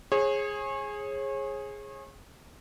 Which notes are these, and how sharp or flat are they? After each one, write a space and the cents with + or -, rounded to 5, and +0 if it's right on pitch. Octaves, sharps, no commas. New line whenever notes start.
G#4 +0 C#5 -35